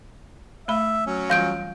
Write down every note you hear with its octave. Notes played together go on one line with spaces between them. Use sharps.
A3 E5 B5
F#3 C#4
E3 G3 F4 F5 G6 D7